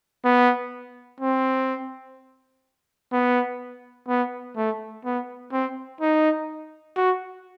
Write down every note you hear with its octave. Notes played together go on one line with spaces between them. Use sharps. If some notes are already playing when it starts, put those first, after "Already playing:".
B3
C4
B3
B3
A3
B3
C4
D#4
F#4